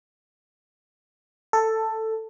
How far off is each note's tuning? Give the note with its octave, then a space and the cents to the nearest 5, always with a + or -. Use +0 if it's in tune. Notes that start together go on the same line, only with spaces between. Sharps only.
A4 +10